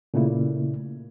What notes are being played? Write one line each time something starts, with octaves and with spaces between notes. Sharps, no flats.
A#2 C#3 A3 A#3 E4